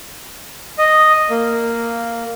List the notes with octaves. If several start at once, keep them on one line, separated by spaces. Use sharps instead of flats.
D#5
A#3